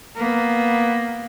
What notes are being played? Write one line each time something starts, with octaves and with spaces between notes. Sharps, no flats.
A#3 B3